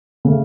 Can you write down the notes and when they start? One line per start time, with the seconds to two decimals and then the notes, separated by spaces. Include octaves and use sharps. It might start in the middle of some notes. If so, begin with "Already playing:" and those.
0.25 C#3 A3